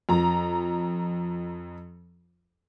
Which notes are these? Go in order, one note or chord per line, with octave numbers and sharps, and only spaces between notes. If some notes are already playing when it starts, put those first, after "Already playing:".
F2 A#5